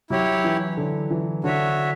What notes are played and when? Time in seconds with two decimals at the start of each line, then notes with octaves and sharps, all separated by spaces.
0.10 F#3 E4 G4 C#5
0.44 E3
0.77 D3
1.10 E3
1.44 D3 F#4 C#5 E5